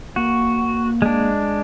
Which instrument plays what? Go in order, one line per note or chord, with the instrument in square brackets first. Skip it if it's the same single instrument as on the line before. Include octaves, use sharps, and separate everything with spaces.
[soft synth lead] A#3 [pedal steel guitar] F#4
[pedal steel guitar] G#3 D4